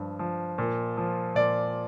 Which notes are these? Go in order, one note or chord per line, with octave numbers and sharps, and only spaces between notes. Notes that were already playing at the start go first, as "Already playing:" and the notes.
Already playing: G2 F3
F3
A#2
F3
A#2 D5